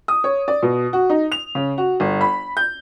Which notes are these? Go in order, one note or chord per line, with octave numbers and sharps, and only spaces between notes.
D#6
C#5
D5
B2
F#4
D#4
F7
C#3
F#4
G1
B5
G6